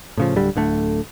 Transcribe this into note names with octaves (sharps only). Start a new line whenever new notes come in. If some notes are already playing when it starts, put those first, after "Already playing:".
A2 C#3 F3
D1 D3 G3
D1 D3 A3